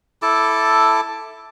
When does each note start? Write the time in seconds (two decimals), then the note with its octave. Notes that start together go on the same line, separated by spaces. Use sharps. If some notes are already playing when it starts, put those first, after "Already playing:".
0.22 E4 A4 A5 D6